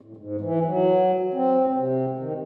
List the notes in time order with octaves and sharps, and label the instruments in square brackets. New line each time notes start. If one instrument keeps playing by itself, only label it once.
[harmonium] A2
G#2
E3
F#3
C4
C3
D#3